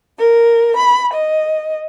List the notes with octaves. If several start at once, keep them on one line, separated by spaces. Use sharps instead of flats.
A#4
B5
D#5